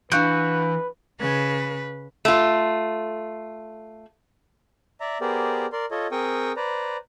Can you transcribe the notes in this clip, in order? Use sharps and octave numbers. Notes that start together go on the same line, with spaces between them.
E3 D4 F#4 B4 F5 G6
C#3 B4
A3 F4
D5 E5 A#5
B3 G4 G#4 A#4 C5 D5
A#4 D5 C6
F4 A4 C#5 D#5
C4 G#4 A#4 G5 C#6 D#6
B4 C5 D5 A#5